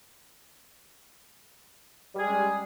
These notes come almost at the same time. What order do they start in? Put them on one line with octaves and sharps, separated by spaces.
G3 G#4 G#3 C#4